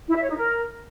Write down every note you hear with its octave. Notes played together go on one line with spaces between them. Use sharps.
E4
E5
C#5
D#4
A#4